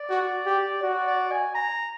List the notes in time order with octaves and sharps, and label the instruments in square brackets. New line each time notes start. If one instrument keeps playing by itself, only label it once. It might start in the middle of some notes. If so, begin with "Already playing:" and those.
Already playing: [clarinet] D5
[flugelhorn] F#4
G4
[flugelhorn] F#4 [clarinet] D5
[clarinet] D5
G#5
A#5